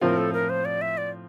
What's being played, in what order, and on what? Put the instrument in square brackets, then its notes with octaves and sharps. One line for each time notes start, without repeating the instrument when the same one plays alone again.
[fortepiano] A2 F3 C4 F4 [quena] A#4
[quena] A4
A#4
C5
D5
E5
D5